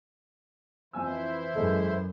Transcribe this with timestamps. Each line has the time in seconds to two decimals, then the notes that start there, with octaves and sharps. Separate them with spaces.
0.93 F2 E3 E4 C5 G#5 E6
1.55 F#2 G#3 A4